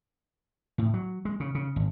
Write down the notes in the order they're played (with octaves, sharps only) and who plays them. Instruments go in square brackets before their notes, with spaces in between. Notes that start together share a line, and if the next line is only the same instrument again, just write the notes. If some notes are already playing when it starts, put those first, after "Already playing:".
[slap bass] A2
F#3
G#3
C#3
C#3
G#1